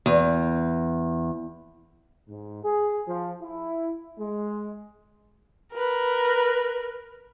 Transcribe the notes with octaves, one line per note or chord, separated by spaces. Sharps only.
E2
G#2
G#4
F3
E4
G#3
A#4 B4